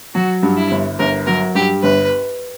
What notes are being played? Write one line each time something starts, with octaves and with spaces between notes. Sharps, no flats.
F#3 F#4
G2
E4
G1
G1 A#4
F#3 A#4
G2 G4
G1 B4